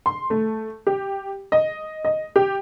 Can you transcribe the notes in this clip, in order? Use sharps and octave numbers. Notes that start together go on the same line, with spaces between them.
C6
A3
G4
D#5
D#5
G4